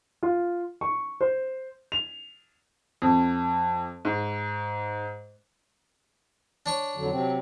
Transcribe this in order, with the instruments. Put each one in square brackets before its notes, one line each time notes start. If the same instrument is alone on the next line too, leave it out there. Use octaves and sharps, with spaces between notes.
[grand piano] F4
C#6
C5
F7
[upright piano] F2
G#2
[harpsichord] D4 C#5 C#6
[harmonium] F2 D3 F#3
C3 F#3 C4